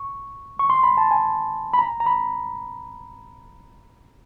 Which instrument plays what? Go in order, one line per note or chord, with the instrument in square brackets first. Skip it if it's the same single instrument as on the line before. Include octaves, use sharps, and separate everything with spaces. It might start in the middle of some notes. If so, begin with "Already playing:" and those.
Already playing: [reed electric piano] C#6
C#6
C6
B5
A5
G#5
B5
A#5
A#5
B5